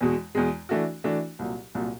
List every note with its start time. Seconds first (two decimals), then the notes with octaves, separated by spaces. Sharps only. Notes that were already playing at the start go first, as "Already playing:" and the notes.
0.01 E2 B2 G#3
0.35 E2 B2 G#3
0.69 E3 A3 D4 F#4
1.04 E3 A3 D4 F#4
1.39 C2 A#2 F#3
1.75 C2 A#2 F#3